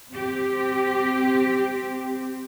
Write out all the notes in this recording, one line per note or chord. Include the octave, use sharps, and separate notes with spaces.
C4 G4